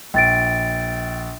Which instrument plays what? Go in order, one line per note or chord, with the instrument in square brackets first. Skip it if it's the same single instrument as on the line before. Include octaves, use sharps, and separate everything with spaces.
[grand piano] A#1 [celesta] G5 A6 D7